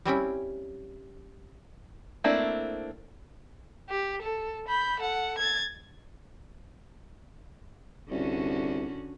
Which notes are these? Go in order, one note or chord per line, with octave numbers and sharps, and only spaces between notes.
G3 C4 C#4 E4
A3 A#3 C4 D4 E4
G4
A4
B5 G6
A4 F#5
G#6 A6
C2 D3 C#4 F#4